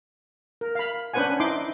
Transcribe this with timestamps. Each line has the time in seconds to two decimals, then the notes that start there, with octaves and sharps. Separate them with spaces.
0.61 A#4
0.75 F5 B5
1.13 C#4 D4 B4 C5 F#5 G#5
1.40 D#4 E4 C6 D6